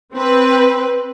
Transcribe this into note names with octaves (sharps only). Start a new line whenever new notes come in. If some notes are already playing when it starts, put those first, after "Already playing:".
C4 B4